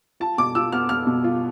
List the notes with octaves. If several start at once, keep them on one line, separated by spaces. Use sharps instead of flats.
F4 A5
B2 D6
F4 E6
B3 F6
B3 F6
B2
F4